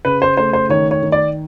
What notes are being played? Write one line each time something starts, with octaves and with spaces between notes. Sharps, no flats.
C#3 B4
C5
A3 C5
C5
D#3 C#5
C#5
D#3
D5